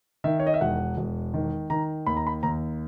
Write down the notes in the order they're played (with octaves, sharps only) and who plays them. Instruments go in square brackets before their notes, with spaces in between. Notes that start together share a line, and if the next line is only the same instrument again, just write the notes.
[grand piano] D#3 E5
C#5
D#5
E5
E1 F#5
E1
D#3
D#3 A#5
D#2 B5
A#5
B5
D#2 A#5